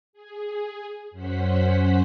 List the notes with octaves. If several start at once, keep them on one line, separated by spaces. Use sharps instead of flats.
G#4
F#2 C#4 C5 F#5 B6